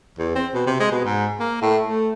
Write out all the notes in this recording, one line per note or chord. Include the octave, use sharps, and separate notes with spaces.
E2
C4
B2
C3
G#3
B2
G#2
A#3
A2
A3